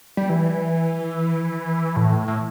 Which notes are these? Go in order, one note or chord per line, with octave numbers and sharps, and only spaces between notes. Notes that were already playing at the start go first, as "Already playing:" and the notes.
G3
E3
A2
A2